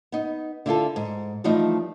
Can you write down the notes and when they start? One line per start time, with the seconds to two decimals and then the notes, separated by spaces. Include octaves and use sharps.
0.12 B3 D#4
0.66 D3 E4 F4 A4
0.96 G#2
1.44 E3 F3 G3 A3 D#4